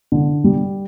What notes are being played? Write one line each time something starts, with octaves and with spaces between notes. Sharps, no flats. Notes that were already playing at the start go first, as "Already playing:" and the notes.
D3
G3